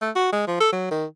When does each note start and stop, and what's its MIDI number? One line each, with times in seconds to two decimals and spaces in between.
0.02 0.11 57
0.16 0.32 66
0.33 0.45 56
0.48 0.60 53
0.60 0.72 69
0.73 0.87 54
0.91 1.05 51